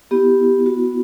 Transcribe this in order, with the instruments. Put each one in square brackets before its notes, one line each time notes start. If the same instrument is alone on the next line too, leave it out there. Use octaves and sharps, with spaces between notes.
[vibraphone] B3 E4 G4
F#4